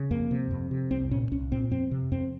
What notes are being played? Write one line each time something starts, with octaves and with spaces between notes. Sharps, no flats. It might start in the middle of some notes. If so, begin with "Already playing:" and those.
Already playing: C#3
F2 A#3
C3
F2
C3
C2 C4
A#2 C#4
C2 C#4
A#2 C4
F2 C4
C3
F2 C4